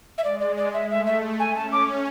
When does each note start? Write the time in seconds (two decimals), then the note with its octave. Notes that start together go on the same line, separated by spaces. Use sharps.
0.18 E5
0.24 G#3 D5
0.40 D5
0.57 D5
0.73 E5
0.90 A3 E5
1.06 E5
1.39 G#5
1.55 C#4 A5
1.72 D6